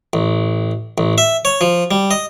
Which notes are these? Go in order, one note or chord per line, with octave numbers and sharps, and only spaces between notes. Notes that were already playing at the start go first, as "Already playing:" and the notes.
A1
A1
E5
C#5
F3
G3
D#5